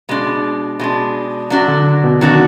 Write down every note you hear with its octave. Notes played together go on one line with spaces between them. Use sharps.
B2 G#3 D4
B2 G#3 D4
F#3 D4 F#4
D3
B2
D#3 F#3 D4 F#4